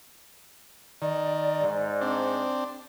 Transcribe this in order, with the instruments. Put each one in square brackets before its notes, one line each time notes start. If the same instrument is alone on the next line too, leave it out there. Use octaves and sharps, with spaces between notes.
[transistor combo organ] D#3 [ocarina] D5
[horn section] G#2
[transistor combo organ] C4 D4